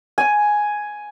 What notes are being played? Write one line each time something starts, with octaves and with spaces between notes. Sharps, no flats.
G#5